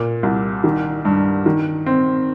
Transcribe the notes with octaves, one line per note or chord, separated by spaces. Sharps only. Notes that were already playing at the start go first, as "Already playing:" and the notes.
Already playing: A#2
C2
D#3
G2
D#3
C4